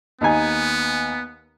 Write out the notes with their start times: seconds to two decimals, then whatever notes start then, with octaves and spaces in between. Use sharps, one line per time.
0.21 D#2 B3 D#4 G#5